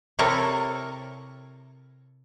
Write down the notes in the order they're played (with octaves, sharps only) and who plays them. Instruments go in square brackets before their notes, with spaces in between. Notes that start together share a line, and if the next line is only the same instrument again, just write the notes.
[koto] C3 E4 A4 A#4 C#5